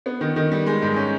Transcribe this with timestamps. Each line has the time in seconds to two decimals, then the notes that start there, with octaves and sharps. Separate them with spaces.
0.06 B3
0.21 D#3
0.36 D#3
0.51 G3
0.66 G#3
0.82 G#2
0.96 C#4